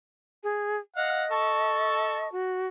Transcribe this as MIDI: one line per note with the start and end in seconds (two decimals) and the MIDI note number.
0.44 0.77 68
0.96 2.31 75
0.96 1.24 77
0.96 1.24 78
1.31 2.31 69
1.31 2.31 81
1.31 2.31 85
2.32 2.68 66